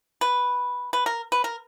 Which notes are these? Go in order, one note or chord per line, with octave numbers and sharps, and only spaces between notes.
B4
B4
A#4
B4
A#4